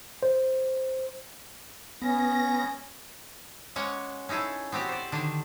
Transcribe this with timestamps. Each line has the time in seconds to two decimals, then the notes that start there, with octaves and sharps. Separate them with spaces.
0.23 C5
2.02 B3 C#4 A#6
3.76 G#3 A#3 C#4 C#5 F#5
4.29 C#4 D#4 E4 G#4 A4
4.72 B3 C4 F#4 G4
4.89 C5 D5
5.12 D3 D#3 D4